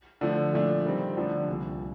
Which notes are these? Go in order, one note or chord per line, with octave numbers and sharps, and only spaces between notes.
D3 F3 A3
A#2 F3 A3 D4
D#3 G3 C4
D3 F3 A3 D4
C2 A#2 G3